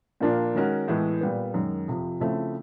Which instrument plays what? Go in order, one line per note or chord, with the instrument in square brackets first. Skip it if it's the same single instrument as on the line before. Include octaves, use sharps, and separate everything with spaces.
[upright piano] A#2 F3 A#3 D4 F4
D#3 G#3 C#4 F#4 A#4
A2 E3 G#3 B3
A#2 G3 B3
F#2 D#3 G#3
F2 C3 F3
C#3 F3 A3 C4 E4